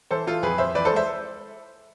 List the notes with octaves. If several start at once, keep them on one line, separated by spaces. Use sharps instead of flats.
E3 A4 C5
E3 F4 A4
F2 G#4 B4
F2 C5 E5
E3 B4 D5
A4 C5
G#3
C5 E5